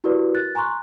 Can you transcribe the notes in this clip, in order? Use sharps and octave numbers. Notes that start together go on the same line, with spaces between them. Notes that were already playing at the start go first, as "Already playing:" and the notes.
E4 F#4 G4 A#4 B4 D5
F#6 A6
G#5 A#5 C6 C#6 F#6